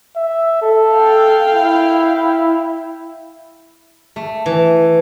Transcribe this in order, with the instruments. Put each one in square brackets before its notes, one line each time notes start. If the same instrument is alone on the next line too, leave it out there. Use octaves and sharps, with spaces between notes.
[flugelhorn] E5
A4
[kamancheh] F5 G5
[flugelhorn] E4
[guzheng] A3
E3